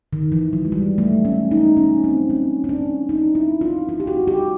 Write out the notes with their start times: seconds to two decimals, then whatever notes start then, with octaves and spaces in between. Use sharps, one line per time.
0.13 D#3
0.32 E3
0.53 F#3
0.65 G#3
0.72 G3
0.98 A3
1.25 C#4
1.51 D#4
1.77 C#4
2.04 C4
2.30 C#4
2.64 C#4
2.69 D4
3.09 D#4
3.35 E4
3.61 F4
3.89 F4
4.00 G4
4.07 F#4
4.28 G4